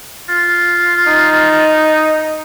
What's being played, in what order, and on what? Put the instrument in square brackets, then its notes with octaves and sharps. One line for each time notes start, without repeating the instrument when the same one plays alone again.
[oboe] F4
[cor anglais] D#4